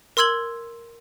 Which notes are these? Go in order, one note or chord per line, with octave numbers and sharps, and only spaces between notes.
A#4 C6 E6 G#6 F#7